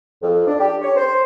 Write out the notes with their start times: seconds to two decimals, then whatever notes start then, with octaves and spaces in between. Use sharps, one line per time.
0.22 F2
0.46 D4
0.60 G4
0.82 C#5
0.96 C5